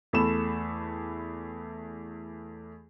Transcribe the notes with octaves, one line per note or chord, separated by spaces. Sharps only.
E2 A3 A4 B5 E7